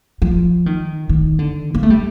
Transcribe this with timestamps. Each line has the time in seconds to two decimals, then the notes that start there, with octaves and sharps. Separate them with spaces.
0.22 F3
0.66 D#3
1.09 D#3
1.39 D3
1.75 A#3
1.83 A3
1.90 G3